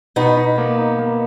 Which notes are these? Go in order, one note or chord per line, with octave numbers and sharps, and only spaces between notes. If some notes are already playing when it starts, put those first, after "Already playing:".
B2 B3 D#4
D#4
A#3
D#4
A#3